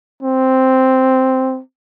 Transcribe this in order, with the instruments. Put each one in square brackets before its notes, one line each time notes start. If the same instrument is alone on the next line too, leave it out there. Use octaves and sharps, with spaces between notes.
[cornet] C4